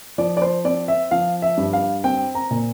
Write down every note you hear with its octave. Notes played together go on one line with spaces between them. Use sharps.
F3 D5
D5
C5
C4 D5
E5
F3 F5
E5
G2
F5
C4 G5
A#5
A#2